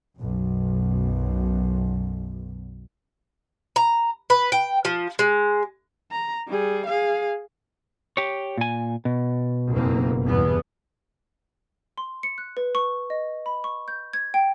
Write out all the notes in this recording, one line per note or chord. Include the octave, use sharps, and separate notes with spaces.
B1 F#2
A#5
B4
G5
F3
G#3
A#5
G3 G#4
G#4 F5
G4 C#5
A#2 G#5
B2
F#1 F2 A#3
E2 G2 B3
C6
C#7
F#6
B4
C#6
D#5
B5
C#6
G6
G#6
G5